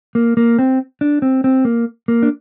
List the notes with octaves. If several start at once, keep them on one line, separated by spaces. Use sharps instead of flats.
A#3
A#3
C4
D4
C4
C4
A#3
A#3
D4